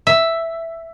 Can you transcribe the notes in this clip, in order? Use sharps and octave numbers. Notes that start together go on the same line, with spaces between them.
E5